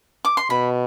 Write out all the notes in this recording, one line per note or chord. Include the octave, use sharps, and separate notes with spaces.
D6
C6
B2 B5